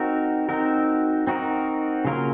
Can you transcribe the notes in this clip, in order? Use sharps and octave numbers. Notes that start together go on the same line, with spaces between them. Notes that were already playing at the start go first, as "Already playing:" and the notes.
Already playing: C4 D#4 F#4 A#4
C4 D#4 F#4 A#4
C4 D#4 F#4 A#4
C#3 F#3 A#3 F4 A#4